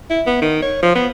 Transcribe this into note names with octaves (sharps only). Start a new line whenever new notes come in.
E4
B3
D#3
C#5
F3
B3